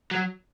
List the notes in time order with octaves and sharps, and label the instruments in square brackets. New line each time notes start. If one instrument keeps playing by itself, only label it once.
[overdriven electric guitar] F#3